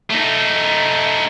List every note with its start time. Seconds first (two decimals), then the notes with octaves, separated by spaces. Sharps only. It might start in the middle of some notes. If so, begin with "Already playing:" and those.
0.10 A3 D#4